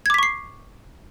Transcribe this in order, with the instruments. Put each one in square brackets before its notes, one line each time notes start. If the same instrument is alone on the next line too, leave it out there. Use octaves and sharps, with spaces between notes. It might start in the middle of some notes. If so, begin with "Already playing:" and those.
[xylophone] G#6
D6
B6
C#6
C7